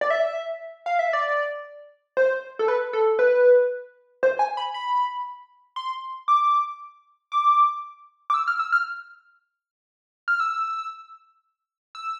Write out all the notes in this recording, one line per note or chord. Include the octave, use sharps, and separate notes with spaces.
D5
E5
F5
E5
D5
C5
A4
B4
A4
B4
C5
G#5
B5
B5
C6
D6
D6
D6
E6
F6
E6
F6
F6
E6
E6